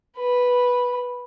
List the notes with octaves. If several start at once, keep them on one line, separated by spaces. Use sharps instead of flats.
B4